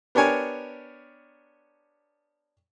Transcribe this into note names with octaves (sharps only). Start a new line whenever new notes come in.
B3 D4 G4 A#4 C#5 G#5